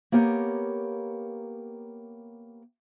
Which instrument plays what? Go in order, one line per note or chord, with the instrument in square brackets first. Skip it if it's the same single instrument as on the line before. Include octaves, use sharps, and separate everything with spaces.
[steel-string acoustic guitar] A#3 B3 G4 A#4 C#5